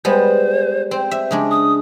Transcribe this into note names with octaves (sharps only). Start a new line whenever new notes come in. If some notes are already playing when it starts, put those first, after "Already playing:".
G3 G#3 B3 C5
C4 C5
E5
C#3 G#3 D4
D#6